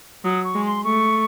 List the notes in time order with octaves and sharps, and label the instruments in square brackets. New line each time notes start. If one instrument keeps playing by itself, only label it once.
[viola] F#3 [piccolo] D#6
[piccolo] C#6
[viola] G#3
[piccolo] C6
[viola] A3 [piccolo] C#6